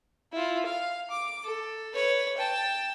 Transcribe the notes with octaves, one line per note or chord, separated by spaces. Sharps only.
E4 F4
F5
D6
A4
B4 C#5
G5 A5